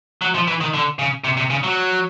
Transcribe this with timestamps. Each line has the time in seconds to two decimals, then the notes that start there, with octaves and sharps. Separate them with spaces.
0.22 F#3
0.35 F3
0.48 E3
0.61 D#3
0.74 D3
0.99 C#3
1.24 C3
1.37 C3
1.50 C#3
1.64 F#3